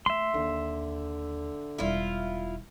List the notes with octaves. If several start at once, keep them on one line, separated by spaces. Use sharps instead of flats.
A3 E5 C6
D#2 D3
E1 G3 E4 F4